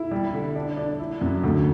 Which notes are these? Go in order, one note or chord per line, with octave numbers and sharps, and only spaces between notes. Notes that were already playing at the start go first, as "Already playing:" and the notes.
Already playing: E4
G3
D3
D4
D4
E4
F#2
D2